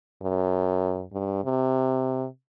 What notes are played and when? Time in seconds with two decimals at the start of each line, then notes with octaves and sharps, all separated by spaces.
0.22 F#2
1.13 G2
1.44 C3